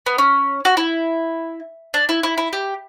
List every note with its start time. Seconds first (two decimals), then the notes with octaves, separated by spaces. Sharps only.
0.06 B3
0.18 C#4
0.65 F#4
0.77 E4
1.94 D4
2.09 E4
2.23 E4
2.38 E4
2.53 G4